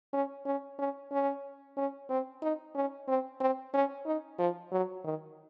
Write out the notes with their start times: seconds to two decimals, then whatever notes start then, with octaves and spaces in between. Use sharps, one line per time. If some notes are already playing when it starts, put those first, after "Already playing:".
0.13 C#4
0.46 C#4
0.79 C#4
1.12 C#4
1.77 C#4
2.10 C4
2.42 D#4
2.75 C#4
3.08 C4
3.40 C4
3.74 C#4
4.06 D#4
4.39 F3
4.72 F#3
5.04 D#3